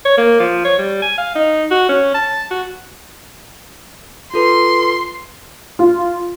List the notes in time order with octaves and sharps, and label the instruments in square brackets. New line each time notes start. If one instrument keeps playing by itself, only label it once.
[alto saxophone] C#5
A#3
F3
C#5
G3
G#5
F5
D#4
F#4
C#4
A5
F#4
[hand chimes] F4 A4 B4 [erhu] C6
[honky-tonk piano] F4